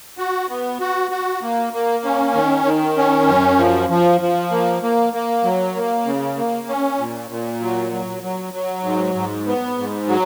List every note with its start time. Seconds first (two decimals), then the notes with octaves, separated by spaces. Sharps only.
0.18 F#4
0.49 B3
0.80 F#4
1.11 F#4
1.42 A#3
1.73 A#3
2.05 C#4
2.34 D#3
2.65 D#3
2.97 C#4
3.28 F#2
3.59 F3
3.90 F3
4.21 F3
4.51 A#3
4.83 A#3
5.13 A#3
5.44 F#3
5.76 A#3
6.05 C#3
6.37 A#3
6.68 C#4
6.99 A#2
7.30 A#2
7.61 F#3
7.92 F#3
8.23 F#3
8.54 F#3
8.84 G#2
9.15 G#2
9.47 B3
9.78 G#2
10.08 F#3